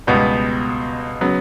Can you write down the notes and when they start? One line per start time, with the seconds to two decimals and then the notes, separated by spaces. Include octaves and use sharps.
0.07 C#2 B2 G3 B3
1.21 C#3 F#3 B3